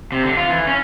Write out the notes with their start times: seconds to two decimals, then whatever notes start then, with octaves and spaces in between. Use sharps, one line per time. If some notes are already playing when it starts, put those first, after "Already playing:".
0.12 C3
0.24 D3
0.37 F4
0.50 E3
0.67 C#4